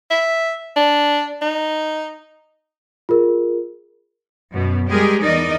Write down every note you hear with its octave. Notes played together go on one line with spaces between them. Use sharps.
E5
D4
D#4
F4 G#4 A#4
F#2 B2
G3 G#3 G4 G#4 A#4
E2 D#4 A#4 D5 D#5